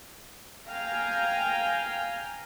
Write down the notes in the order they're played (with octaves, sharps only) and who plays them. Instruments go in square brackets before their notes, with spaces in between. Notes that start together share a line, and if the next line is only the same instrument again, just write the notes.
[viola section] F5 G5 G#5 A#5